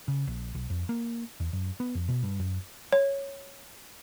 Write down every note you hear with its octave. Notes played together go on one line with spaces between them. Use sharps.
C#3
A#1
B1
F2
A#3
E2
F#2
B3
F2
B2
G2
F#2
C#5